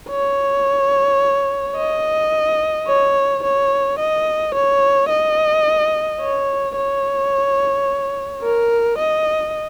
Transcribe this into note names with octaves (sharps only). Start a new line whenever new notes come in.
C#5
D#5
C#5
C#5
D#5
C#5
D#5
C#5
C#5
A#4
D#5